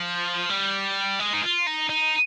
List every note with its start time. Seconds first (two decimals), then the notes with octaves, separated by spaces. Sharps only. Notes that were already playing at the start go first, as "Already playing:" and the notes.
Already playing: F3
0.49 G3
1.20 G#3
1.33 D#4
1.43 F4
1.67 D#4
1.90 D#4